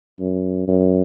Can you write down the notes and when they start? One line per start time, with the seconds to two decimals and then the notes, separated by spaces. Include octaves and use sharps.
0.20 F#2
0.68 F#2